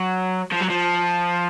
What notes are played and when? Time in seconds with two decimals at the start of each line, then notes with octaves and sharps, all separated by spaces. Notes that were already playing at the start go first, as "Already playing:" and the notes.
Already playing: F#3
0.52 F3
0.60 F#3
0.69 F3